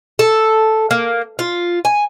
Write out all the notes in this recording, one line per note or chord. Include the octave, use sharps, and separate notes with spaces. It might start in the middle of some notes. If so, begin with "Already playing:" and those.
A4
A#3
F4
G#5